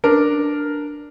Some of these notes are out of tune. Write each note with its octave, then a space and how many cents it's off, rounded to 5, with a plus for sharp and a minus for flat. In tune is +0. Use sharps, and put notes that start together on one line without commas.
D4 +0 A#4 +0